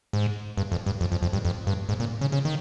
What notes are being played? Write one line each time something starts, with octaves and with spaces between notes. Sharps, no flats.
G#2
G2
F2
G2
F2
F2
F2
G2
F2
G2
G#2
A#2
C#3
C#3
D#3